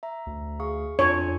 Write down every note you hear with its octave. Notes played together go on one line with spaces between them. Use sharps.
E5 A#5
D2
G#4 F5 C#6
F2 D4 F4 C#5 G#5